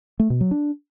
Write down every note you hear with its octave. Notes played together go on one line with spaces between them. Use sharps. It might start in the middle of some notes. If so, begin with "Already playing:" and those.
A3
B2
F#3
D4